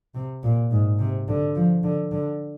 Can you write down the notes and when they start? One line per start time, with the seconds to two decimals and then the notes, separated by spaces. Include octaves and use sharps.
0.15 C3
0.43 A#2
0.71 G#2
0.99 C3
1.28 D3
1.56 F3
1.84 D3
2.12 D3